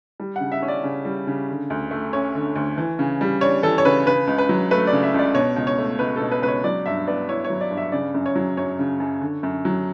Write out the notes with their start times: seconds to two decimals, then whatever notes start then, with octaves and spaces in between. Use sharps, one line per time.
0.20 G3
0.36 C#3 F#5
0.52 E5
0.62 C#4
0.68 D5
0.84 C#3
1.05 G3
1.27 C#3
1.49 D3
1.70 D2
1.91 A3
2.13 C#4 C#5
2.35 D3
2.55 D2
2.78 E3
2.99 C#3
3.21 G3
3.41 D4 C#5
3.63 E3 A4
3.78 C#5
3.85 C#3 B4
4.06 C#3 B4
4.27 C#2
4.38 B4
4.49 F#3
4.71 A3 B4
4.87 D5
4.92 C#3
5.03 E5
5.14 C#2 D5
5.34 B2 C#5
5.56 C#2
5.67 C#5
5.78 A3
5.99 C#2 B4
6.16 B2 A4
6.31 B4
6.42 C#2 B4
6.48 C#5
6.64 F#3 D5
6.86 G2 E5
7.07 B3 D5
7.29 E4 C#5
7.44 C#5
7.50 F#3
7.61 D5
7.71 G2
7.77 E5
7.92 C#3 D5
8.14 F#2
8.26 C#5
8.35 F#3
8.57 F#2 C#5
8.79 C#3
9.00 F#2
9.21 D3
9.43 F#2
9.65 F#3